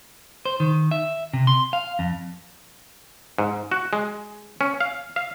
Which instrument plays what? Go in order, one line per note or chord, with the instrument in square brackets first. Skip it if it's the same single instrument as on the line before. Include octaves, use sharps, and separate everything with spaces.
[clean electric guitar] C5
D#3
E5
C3
C6
F5
F2
[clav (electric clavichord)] G#2
F#4
G#3
C#4
F5
F5